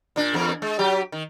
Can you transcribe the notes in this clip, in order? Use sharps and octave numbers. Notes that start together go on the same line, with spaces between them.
A#2 D4
E2 A#3 A#4
G#3
F#3 G4
D#3